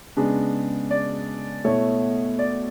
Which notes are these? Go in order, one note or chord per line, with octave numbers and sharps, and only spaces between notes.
C#3 G#3 B3 D4
D5
B2 A3 E4 C#5
D5